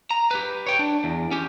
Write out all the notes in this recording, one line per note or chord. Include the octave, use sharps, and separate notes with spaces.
A#5
G4 B4
C#5 G5
D4
E2
C#4 G4